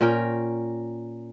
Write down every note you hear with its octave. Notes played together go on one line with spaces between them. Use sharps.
A#2 C#4 A#4 G5